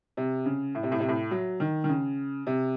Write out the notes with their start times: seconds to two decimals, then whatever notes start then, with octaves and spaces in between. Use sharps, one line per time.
0.17 C3
0.45 C#3
0.75 A2
0.83 C3
0.92 A2
1.00 C3
1.09 A2
1.31 F#3
1.60 D#3
1.84 D#3
1.89 C#3
2.47 C3